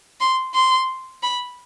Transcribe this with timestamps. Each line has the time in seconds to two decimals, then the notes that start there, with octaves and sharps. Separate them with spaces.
0.20 C6
0.54 C6
1.23 B5